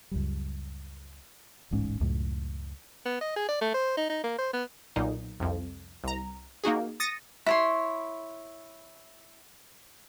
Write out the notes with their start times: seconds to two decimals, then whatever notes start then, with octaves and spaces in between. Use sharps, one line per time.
0.11 C#2 F#2 G3
1.71 D1 A1 G#2 C#4
2.01 C#2 F#2 A2
3.05 B3
3.21 D#5
3.36 G#4
3.49 D5
3.61 A3
3.74 C5
3.97 D#4
4.09 D#4
4.24 A#3
4.39 C5
4.53 B3
4.96 B1 A#2 D#4
5.40 C2 F2
6.04 C2 A#5
6.64 A#3 D#4 F#4 G#4
7.00 D#6 A6 A#6 C#7 D#7
7.46 E4 C#5 C6